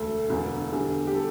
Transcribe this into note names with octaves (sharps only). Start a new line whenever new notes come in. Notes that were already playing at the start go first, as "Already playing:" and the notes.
Already playing: E1 D2 D3 A4
E1 E2 D3
E2 D3 G3
G4
A4